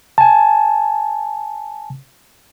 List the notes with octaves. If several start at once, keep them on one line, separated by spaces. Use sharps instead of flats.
G#5 A5